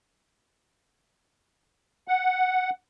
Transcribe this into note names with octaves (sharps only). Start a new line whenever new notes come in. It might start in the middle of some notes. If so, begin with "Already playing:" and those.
F#5